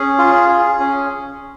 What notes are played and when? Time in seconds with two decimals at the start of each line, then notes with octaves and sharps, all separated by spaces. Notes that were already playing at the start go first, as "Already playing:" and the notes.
Already playing: C#4 G#4
0.18 F4
0.49 G#4
0.80 C#4